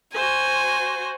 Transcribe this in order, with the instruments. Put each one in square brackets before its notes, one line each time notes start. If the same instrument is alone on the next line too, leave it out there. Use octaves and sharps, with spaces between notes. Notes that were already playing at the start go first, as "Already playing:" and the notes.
[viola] F#4 C5 [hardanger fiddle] G#5